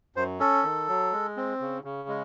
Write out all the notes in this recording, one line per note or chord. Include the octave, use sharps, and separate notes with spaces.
F#2 C5
C#4 A4
D#3
F#3
G#3
C4
C#3
C#3
G#3